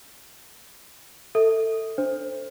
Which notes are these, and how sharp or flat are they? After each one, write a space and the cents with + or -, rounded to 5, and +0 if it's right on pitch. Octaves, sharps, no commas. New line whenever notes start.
A4 +20 E5 -30
D4 +0 C5 +0